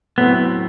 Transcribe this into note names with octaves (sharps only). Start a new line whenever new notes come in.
A2 F#3 A3 B3 C4 E4